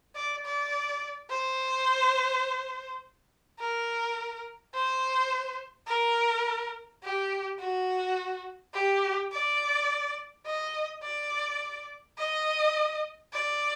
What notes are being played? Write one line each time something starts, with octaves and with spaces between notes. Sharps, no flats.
D5
D5
C5
A#4
C5
A#4
G4
F#4
G4
D5
D#5
D5
D#5
D5